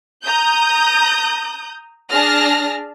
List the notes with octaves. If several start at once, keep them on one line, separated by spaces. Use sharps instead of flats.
A#5 D#6 G6
D4 G#4 A5 F6 A#6